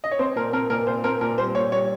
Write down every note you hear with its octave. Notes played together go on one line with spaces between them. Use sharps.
D#5
C#5
C4 C5
A#2 A#4
C4 A#4
A#2 A#4
A#2 C5
C4 A#4
A#2 A#4
G3 C5
A#2 C#5
G3 C#5